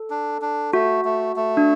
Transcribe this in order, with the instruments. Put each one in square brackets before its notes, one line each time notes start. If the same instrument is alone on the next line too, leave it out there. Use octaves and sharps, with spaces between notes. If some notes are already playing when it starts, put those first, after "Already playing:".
Already playing: [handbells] A4
[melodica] D4
D4
[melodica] A3 [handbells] F#4
[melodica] A3
A3
[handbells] D4